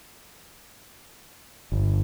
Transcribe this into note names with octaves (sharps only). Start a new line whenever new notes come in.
G1